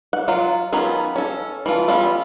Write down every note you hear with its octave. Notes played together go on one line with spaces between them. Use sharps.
F#5
F#3 F4
D#3 F#3 B3 C#4 F4
C#4 A4
E3 A3 F4
G3 B3 C#4 F4 A4